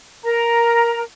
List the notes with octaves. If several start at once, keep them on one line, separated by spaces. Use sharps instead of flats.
A#4 A#5